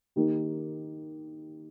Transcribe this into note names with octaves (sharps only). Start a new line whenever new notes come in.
D#3 A#3 D#4 G4